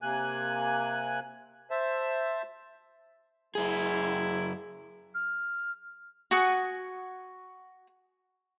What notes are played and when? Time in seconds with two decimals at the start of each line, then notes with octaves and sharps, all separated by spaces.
0.02 C3 A#3 G#5 F#6
1.71 C5 E5 A5
3.55 F#2 G#3 E4 G#4
5.15 F6
6.31 F#4 F#5 G#5 D#6